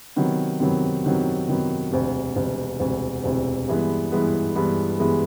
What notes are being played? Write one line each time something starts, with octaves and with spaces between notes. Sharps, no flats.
C3 D#3 F#3 B3
C3 D#3 F#3 B3
C3 D#3 F#3 B3
C3 D#3 F#3 B3
E1 D2 C3
E1 D2 C3
E1 D2 C3
E1 D2 C3
G2 E3 G#3 B3
G2 E3 G#3 B3
G2 E3 G#3 B3
G2 E3 G#3 B3